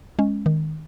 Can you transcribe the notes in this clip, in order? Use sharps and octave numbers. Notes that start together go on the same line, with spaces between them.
G#3 C#4
D#3